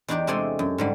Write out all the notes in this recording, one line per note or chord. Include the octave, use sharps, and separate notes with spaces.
E2 D4 D#4 G4 D5
C3 G#3 A3 D5 G#5 C6
F#2
G#2 D3 G3